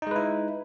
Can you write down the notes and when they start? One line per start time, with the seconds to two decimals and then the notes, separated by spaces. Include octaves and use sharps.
0.02 D#4
0.07 G#3
0.11 B4
0.16 E4